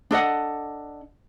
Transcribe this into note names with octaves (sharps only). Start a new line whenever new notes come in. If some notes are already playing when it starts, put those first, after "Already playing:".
D4 A4 D#5 F#5